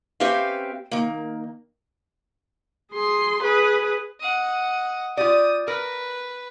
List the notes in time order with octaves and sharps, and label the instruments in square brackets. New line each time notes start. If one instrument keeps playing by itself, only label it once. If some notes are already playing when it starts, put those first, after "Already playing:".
[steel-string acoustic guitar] C4 C#4 G4 B4 E5 F5
D#3 A#3
[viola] G#4 C6
G#4 B4
[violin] D#5 F#5
[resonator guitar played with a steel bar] F4 G4 D5 [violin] D#6
[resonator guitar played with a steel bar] A#4 [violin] B4